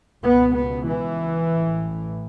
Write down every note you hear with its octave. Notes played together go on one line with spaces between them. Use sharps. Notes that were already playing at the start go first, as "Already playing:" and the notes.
C#2 B2 B3
B3
E3
A1 A2